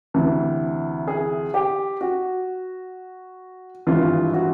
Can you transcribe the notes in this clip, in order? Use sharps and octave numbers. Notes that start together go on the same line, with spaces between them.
D2 C3 E3
G#4
G4
F#4
G#1 G2 E3 F4
F#4